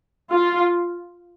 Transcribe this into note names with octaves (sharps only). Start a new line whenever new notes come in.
F4